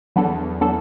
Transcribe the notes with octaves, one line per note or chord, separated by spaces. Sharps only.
E2 F#3 B3 D4 A4
F#3 B3 D4 A4